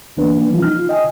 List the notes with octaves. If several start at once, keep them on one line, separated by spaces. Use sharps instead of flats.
D2 E3 A#3 B3 D4 B4
A#3 D4
E3 F3 G3 C#4 E4 F4
D#4 F6
F4
D#5 G5 G#5 D#6